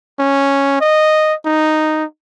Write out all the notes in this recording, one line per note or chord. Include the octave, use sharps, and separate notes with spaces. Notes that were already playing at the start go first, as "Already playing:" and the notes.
C#4
D#5
D#4